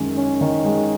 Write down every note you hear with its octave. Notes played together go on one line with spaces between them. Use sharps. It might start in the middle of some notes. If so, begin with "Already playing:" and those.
Already playing: F#2 D#3 G#3
C#4
D#3
G#3